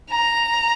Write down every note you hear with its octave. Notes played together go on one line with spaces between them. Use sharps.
A#5